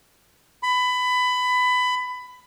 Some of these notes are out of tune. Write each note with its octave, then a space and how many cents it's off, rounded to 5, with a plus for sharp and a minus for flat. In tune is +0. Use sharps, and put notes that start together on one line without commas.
B5 +20